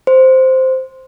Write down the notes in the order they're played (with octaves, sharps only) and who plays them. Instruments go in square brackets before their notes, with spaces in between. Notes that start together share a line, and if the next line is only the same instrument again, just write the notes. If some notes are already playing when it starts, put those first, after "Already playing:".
[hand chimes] C5